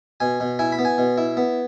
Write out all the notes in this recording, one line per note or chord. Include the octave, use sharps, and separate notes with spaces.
B2 G#5
B2
E4 G#5
B5
B3
G#5
B2
E4
B3